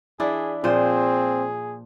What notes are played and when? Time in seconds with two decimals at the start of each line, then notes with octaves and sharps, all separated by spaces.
0.20 E3 D4 E4 G#4
0.64 A#2 F3 C4 G#4 C5